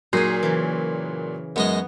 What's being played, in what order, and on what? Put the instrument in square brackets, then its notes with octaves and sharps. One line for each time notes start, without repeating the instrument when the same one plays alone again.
[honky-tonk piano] A#2 C7 [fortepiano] F#3 [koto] D#4 G#4
[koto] C#3 E3
[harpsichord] F#2 G#3 D#5 [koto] B3